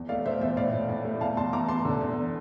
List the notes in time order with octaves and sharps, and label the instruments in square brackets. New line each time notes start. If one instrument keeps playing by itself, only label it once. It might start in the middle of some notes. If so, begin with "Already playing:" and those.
Already playing: [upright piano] E2
A3 D5 F5
E2 C5 E5
E2 C5 E5
A2 D5 F5
A2
A2
A3
E2 F5 A5
E2 A5 C6
E2 A#5 D6
E2 A5 C6
D3
E2